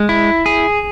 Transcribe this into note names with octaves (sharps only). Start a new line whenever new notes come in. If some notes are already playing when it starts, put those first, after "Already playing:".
Already playing: G#3
E4
G#4